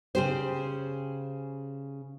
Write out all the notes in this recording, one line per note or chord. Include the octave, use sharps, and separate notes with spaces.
C#3 G4 C5